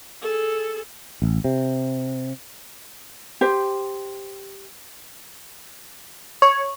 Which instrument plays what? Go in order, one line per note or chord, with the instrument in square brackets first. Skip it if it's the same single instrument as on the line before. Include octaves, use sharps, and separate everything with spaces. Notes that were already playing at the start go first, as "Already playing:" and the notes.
[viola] G#4 A4
[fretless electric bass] A1
C3
[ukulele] G4 C5
[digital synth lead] C#5 [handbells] C#6